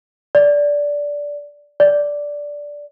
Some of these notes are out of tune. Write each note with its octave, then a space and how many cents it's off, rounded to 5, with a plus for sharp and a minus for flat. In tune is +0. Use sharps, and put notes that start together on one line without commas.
D5 -15
D5 -10